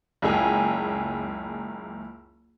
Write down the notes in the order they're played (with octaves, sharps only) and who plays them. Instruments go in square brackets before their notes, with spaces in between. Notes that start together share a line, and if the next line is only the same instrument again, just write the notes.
[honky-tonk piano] F#1 C#2 G#4 G#5